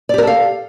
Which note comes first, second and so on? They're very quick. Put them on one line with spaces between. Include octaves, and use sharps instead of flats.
D5 G4 A#4 A4 F5